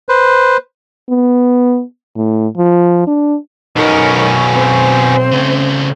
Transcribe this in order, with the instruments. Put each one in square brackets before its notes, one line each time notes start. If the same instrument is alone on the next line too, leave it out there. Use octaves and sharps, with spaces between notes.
[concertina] B4 C5
[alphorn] B3
A2
F3
D4
[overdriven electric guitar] B1 [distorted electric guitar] B2 C#4 [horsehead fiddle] D#4 A#4
[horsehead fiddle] C4 C5
[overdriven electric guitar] C#3 A3